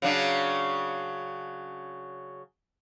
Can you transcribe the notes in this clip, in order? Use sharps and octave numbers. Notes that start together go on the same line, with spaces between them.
C#3 F#3 D4